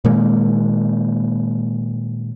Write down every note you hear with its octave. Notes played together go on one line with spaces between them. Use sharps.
A#2 D#3 G#3 A#3